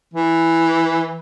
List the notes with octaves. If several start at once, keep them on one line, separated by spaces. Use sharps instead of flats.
E3